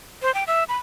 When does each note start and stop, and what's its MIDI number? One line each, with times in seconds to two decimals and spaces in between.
0.22 0.34 72
0.34 0.44 79
0.47 0.64 76
0.69 0.76 83